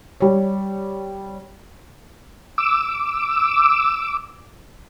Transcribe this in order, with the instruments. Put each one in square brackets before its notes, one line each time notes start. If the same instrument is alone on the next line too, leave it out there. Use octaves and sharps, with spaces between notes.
[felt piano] G3 C#5
[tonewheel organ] D6 E6